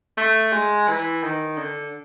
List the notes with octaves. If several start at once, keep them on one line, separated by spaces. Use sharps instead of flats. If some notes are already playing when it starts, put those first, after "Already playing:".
A3
G#3
E3
D#3
D3